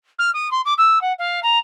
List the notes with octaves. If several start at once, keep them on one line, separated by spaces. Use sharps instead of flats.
F6
D#6
C6
D6
E6
F#5
F5
A#5